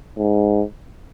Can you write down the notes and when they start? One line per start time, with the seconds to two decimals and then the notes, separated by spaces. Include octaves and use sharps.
0.17 G#2